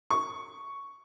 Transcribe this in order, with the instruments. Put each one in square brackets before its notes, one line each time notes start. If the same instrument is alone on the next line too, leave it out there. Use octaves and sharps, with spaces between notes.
[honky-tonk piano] C#6